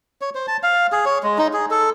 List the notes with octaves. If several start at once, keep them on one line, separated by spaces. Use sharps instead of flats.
C#5
C5
A5
F5
G#4
C#5
G#3
D#4
G#4
A4